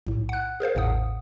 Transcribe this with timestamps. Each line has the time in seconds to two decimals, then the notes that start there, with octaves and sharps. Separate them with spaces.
0.07 B1 A2
0.29 F#5 F#6
0.60 G#4 A#4 C5 F5
0.75 A1 E2 A2 F#5 D#6